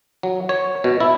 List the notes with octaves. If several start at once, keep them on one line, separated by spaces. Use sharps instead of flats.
F#3
C#5
B2
E4